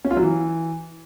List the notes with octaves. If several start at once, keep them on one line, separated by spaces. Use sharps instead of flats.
C#4
F4
F#3
E3